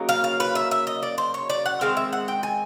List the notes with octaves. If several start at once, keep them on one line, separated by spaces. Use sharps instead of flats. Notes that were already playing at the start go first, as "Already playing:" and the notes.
Already playing: C#3 F#3 A#3 D#4
F5
F5
B4
E5
E5
D#5
D5
C5
C#5
D5
F#5
D#3 G#3 C4 F5
E5
F#5
G5
G#5